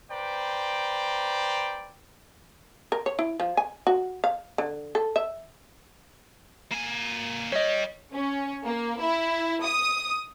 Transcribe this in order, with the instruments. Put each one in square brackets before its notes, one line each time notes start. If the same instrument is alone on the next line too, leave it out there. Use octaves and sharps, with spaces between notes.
[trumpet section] B4 C5 D5 G5 A#5
[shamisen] A#4
C#5
E4
F3
G#5
F#4
F5
D3
A4
E5
[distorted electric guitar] A#3 G#5
[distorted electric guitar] G3 [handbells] C#5 D#5
[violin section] C#4
A#3
E4
D#6